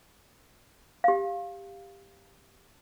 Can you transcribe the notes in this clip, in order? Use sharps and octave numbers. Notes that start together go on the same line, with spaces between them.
G4 F5